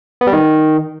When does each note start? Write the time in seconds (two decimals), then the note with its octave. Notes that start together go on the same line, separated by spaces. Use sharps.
0.21 B3
0.27 G3
0.33 D#3